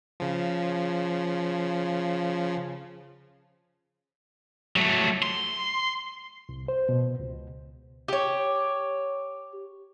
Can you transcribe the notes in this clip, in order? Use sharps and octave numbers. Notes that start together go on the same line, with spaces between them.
C#3 F3
F#3 A3
C6
C2
C5
B2
C#2
G4 C#5